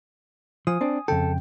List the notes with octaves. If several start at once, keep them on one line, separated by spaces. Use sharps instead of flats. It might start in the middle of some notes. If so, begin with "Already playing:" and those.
F3 G#5 D#6
C4 D4
F2 C#3 A4 G5